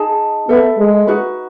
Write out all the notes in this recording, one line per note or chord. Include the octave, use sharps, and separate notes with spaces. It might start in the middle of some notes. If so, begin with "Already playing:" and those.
Already playing: D#4 G#4 D#5 A5
B3 A4 E5 B5
G#3
D#4 F#4 B4